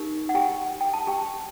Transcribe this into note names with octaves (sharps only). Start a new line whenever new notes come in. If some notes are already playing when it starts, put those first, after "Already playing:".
Already playing: D#4 G4 A#4
F#5
G4 G5
G5
A5
G4 G5